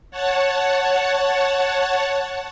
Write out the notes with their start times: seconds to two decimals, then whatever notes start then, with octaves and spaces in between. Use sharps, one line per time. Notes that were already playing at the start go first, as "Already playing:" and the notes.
0.11 C#5 F#5 A5